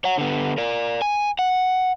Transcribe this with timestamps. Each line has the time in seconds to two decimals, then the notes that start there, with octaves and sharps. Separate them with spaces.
0.04 C#5 F#5
0.18 D3 B3
0.58 A#4 D5
1.02 G#5
1.39 F#5